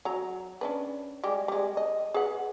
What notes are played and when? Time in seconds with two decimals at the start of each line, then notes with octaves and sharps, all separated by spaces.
0.05 F#3 A#5
0.61 C#4 D4 B4
1.24 G3 G#3 G4
1.48 G3 G#3
1.77 D#5
2.14 G#4 B4 F#5